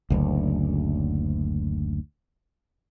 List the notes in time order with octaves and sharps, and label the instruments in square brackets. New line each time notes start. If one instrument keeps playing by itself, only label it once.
[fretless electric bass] F#1 D2